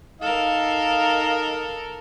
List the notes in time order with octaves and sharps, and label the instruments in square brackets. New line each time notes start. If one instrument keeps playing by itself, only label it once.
[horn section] D#4 D#5 F5 [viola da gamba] A4 A#4